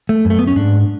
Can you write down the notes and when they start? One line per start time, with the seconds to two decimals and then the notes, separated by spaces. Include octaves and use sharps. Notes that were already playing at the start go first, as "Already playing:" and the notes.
0.09 A3
0.25 F#2
0.30 A3
0.39 B3
0.47 C#4
0.56 G#2 D4